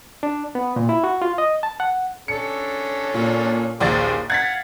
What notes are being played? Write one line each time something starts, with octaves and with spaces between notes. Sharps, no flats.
D4
B3
A#2
E4
F#4
F4
D#5
A5
F#5
C#4 D4 A4 C#7
A#2
A#1 D#2 G#4 C5 D5 A6
F5 F#5 G#6 A6 B6